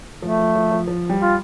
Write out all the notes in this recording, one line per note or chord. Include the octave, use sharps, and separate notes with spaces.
F3 A3
F3
F3
F3
F3
G3
F4